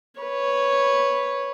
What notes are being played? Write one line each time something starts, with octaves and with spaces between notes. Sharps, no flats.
B4 C#5